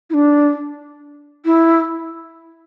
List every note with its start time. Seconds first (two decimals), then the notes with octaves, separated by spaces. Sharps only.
0.10 E4
0.14 D4
1.45 E4